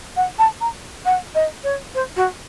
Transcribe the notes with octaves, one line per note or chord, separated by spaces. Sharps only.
F#5
A5
A#5
F#5
D#5
C#5
C5
F#4